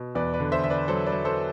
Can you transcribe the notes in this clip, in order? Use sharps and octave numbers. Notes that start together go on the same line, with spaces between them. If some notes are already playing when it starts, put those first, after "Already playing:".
Already playing: B2
E2 B4 D5
B4 D5
D3
C5 E5
D3 E5
B4 D5
F#3 A4 C5
B4 D5
F#3
A4 C5